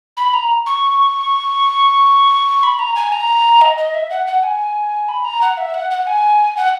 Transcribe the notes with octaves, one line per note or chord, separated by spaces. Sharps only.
B5
A#5
C#6
B5
A#5
G#5
A#5
D#5
D#5
E5
F#5
F#5
G#5
B5
A#5
F#5
E5
F#5
F#5
G#5
F#5